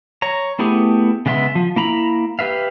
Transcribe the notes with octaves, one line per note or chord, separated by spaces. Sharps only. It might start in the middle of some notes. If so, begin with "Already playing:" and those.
C#5 A#5
A3 B3 E4 G4 G#4
C#3 G#3 B3 E5 C6
F3
A#3 E4 A#5 B5
G4 B4 E5 F5